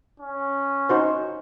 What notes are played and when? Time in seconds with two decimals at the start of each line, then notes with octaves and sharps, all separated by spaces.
0.20 C#4
0.89 D#4 F#4 C5